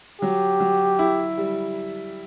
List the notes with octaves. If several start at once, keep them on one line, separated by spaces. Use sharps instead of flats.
F#3 G4
F#3
E4
G3